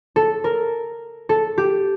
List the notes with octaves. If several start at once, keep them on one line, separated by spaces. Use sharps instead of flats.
A4
A#4
A4
G4